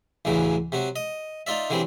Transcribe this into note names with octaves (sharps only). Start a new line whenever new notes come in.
A1 D2 C#3 E3 F#3
C3 F#3 F#4
D#5
D#4 F4 D5 E5
D3 E3 F#3 G3 C4